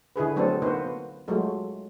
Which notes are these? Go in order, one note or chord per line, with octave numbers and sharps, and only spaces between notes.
D3 E4 G#4 B4
F#3 A3 B3 C4 D4 A4
A#3 B3 D#4 F#4 B4 C5
F#3 G#3 A3 F4